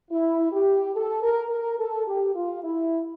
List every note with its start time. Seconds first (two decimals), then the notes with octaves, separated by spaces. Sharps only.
0.11 E4
0.53 G4
0.95 A4
1.23 A#4
1.51 A#4
1.80 A4
2.07 G4
2.35 F4
2.63 E4